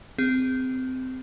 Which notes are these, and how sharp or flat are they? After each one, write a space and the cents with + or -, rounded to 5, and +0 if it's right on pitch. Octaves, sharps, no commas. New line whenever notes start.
C4 -20 G#4 -20